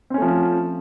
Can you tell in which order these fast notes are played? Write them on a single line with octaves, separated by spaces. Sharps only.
C4 C#4 A3 F3